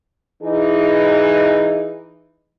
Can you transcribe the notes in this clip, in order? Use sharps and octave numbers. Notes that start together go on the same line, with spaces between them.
E3 D#4 G#4